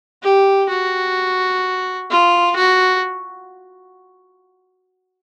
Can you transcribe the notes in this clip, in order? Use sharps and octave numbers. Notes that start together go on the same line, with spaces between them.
G4
F#4
F4
F#4